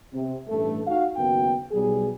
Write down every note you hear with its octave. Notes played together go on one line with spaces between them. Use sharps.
C3
A1 G2 A3
D#4 F#4 F5
F#1 D#2 B3 F#4 G5
B1 G3 G#4